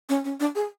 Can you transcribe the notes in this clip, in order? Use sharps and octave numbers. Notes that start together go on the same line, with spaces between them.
C#4
C#4
D4
G#4